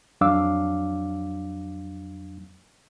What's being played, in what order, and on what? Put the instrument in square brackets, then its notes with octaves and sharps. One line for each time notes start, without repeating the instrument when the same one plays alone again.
[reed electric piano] F2 F#3 D4 F5 D6 E6